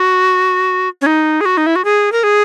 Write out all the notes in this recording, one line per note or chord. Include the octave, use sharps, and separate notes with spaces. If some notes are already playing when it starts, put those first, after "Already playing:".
Already playing: F#4
C#4
D#4
G#4
F#4
D#4
E4
F#4
G#4
A#4
G#4